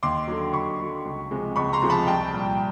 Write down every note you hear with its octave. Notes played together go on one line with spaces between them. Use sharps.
D#2 C6 D6
D3 F#3
D#2 B5 C#6
D3 F#3
C#2
C3 F3 G#3
C#2 B5 C#6
A#5 C6
C3 F3 G#3
A5 B5
C2 G5 A5
A#2 G3